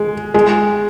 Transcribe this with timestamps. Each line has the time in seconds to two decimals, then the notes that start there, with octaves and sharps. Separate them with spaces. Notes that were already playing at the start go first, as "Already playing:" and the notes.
Already playing: G#3
0.34 G#3